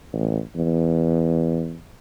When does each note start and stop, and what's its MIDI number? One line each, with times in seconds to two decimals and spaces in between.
0.13 0.38 33
0.55 1.76 40